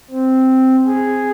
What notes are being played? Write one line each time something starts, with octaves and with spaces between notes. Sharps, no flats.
C4
G#4